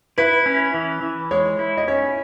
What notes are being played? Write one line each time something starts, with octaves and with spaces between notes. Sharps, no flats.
E4 B4
C#4
E3
E3
G#3 C#5
E4
D#5
C#4 C#5